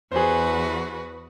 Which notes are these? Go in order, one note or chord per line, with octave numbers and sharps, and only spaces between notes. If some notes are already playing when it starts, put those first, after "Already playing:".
E2 F#4 G#4 B4 C5